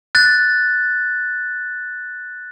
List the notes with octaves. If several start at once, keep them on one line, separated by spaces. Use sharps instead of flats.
F#6 A6